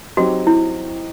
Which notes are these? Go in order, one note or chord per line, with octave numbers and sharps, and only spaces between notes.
F#3 C4 D#4 F#4 G4
E4